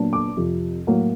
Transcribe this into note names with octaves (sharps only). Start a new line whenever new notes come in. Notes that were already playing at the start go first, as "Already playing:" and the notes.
Already playing: A#2 F#3 B3 D4
D6
F2 C3 F3
A2 F#3 A#3